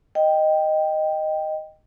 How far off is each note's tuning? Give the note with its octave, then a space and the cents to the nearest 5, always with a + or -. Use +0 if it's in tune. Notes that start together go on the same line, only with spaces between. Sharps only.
D#5 +0 G5 +0